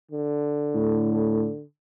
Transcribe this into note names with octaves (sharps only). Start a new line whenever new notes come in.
D3
A2